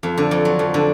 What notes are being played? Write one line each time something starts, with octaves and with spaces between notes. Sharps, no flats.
F2
D3
F2
F#3
F2
D3